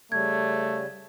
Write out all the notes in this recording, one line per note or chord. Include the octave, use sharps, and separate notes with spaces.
C#3 G3 A3 G#6